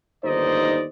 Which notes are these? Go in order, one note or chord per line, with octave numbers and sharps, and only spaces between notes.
G1 D#2 D#4 C5 D5 D#5